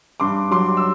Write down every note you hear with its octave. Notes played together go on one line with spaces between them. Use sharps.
G2 C6 D6
F#3 C6 D6
E6